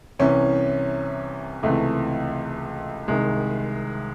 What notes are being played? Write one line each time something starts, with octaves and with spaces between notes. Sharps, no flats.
C2 C3 E3 C#4
C#2 C3 E3 A3
C2 C3 D#3 G#3